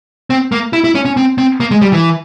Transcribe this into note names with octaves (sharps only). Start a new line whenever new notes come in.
C4
A#3
E4
E4
C#4
C#4
C4
C4
A#3
G#3
G3
E3